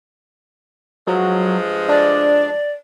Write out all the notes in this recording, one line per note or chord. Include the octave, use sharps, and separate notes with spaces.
G2 F3 F#3 G#3
D4 D5